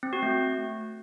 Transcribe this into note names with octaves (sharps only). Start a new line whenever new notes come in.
C4
F#4
A3